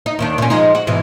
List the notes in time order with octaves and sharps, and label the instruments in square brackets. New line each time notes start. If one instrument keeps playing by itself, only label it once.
[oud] D#4
D#2 D#3 D4
A#2 C#4
F3 G#3 D#4
F#4
G#2 B2 E3